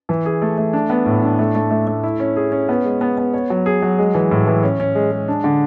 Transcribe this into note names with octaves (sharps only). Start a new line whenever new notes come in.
E3
G#4
A3
A3
D4
B3
A2
D4
A3
A3
A3
A3
E4
C#4
G#4
C#4
B3
G#3
B3
B3
C#5
F#3
G#4
F#3
G#3
E3
A2
E3
C#4
C#4
G#3
G#3
D4
D3